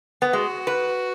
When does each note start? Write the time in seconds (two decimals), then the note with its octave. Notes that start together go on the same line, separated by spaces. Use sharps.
0.22 B3
0.33 G#3 F#4
0.67 B4